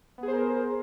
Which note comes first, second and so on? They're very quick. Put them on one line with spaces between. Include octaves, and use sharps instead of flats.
B3 G#4 C5 A#4